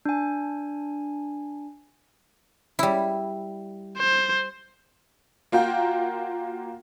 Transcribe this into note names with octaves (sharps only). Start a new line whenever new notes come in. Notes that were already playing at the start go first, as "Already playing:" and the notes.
D4 G#5
G3 E4
C5
A#3 F4 F#4 G5